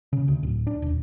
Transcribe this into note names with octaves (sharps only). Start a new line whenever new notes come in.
C#3
D2
D1
D4
D#1